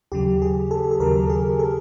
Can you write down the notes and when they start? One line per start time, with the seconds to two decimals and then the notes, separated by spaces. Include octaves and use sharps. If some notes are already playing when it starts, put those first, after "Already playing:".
0.12 D#2 C#3 F#3 G4
0.42 G#4
0.71 A4
0.91 A4
1.00 D#2 C#3 F#3 A#4
1.30 G#4
1.59 A4